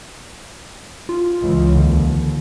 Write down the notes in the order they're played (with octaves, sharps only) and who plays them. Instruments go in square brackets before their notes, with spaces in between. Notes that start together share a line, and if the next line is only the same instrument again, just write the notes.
[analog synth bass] F4
[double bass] C#2 E3
[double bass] D#2 [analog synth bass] D3